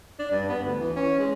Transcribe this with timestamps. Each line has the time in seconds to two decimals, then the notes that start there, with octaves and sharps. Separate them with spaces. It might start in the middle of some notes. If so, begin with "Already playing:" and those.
0.19 D4
0.31 G2
0.48 B3
0.64 D2
0.79 E3
0.96 C#4
1.19 G#3